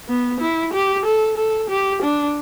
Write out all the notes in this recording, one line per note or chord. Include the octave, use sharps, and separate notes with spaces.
B3
E4
G4
A4
A4
G4
D4